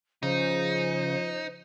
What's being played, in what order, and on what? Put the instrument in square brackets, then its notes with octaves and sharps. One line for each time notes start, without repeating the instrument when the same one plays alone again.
[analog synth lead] C#3 [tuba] F3 [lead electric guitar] D#4 [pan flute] C5